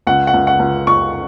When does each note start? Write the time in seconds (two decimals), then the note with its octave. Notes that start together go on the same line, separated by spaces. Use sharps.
0.07 C#2 F#5
0.27 F#5
0.34 C#2
0.47 F#5
0.59 C#2
0.87 C#2 C#6